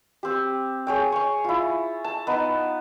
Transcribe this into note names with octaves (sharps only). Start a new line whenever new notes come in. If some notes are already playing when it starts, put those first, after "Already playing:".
C4 G4
G#4 C#5 G5
G#5 C#6
E4 F4
A5
B3 D#4